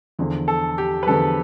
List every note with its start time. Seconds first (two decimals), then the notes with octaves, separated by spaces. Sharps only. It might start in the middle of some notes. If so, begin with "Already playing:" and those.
0.19 E2 D3 F3
0.48 A4
0.78 G4
1.03 B4
1.07 E2 D3 F3 A4